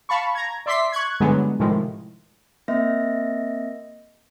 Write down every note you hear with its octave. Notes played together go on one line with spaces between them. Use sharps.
F5 A5 B5 C#6
A#5 G#6
D5 E5 C6 D6 B6 C7
C#6 F#6 G#6
G2 D3 F#3 G#3 B3
A2 C3 D#3 F3 G#3
A#3 C4 D#5 E5 A#6